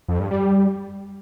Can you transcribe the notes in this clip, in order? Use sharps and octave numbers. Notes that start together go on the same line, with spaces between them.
F2
G2
G3